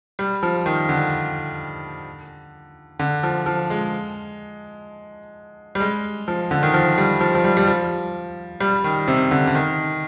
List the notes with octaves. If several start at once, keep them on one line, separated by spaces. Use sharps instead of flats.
G3
F3
D#3
D3
D3
F3
F3
G#3
G3
G#3
F3
D3
D#3
F3
G3
F3
F3
G3
G3
F3
G3
D#3
C3
D3
D3
D#3